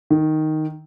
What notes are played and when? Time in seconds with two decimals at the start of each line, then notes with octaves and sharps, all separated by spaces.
0.10 D#3